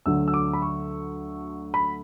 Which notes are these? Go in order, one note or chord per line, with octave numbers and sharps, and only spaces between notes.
D2 D3 F#3 E6
E6
D6
B5
C#6
B5